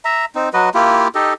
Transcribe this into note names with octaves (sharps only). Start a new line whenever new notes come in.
E5 A#5
C4 D#4
F#3 F#4 B4 D#5
A#3 E4 F4 G4
D#4 G4 A4 D#5